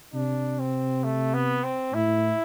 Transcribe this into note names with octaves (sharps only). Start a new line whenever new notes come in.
C3 D4
C4
A3
B3
C4
A2 E4